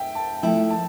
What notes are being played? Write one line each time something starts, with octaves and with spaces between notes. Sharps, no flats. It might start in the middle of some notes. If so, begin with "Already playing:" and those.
Already playing: E5 G5
A5
F3 A3 E4 G5
A5